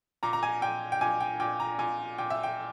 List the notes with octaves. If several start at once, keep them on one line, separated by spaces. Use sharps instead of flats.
A#2 A#5
A#5
G#5
A#2 G5
G5
A#2 G#5
G5
A#2 G5
A#5
A#2 G#5
A#2 G5
E5
G5